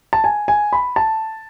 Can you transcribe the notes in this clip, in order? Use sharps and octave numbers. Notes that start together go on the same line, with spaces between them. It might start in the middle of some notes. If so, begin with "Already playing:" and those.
A5
G#5
G#5
B5
A5